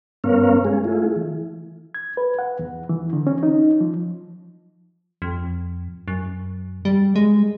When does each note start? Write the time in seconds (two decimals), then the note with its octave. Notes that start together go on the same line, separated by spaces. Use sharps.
0.24 G2 B3 C#4 A#4 C#5 F5
0.65 G#3 G#4
0.84 A3 E4 F4 G#4
1.16 E3
1.95 G#6
2.17 B4
2.39 F#5
2.59 E2
2.89 E3
3.13 D3
3.27 C#4
3.43 D#4
3.81 F3
5.22 F2
6.08 F#2
6.85 G3
7.16 G#3